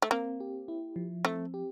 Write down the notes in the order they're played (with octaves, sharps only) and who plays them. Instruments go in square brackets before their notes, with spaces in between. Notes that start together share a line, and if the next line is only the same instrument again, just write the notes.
[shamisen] A3
[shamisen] A#3 [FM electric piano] C4
[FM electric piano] G4
E4
F3
[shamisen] A3 [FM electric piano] C4
[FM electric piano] G4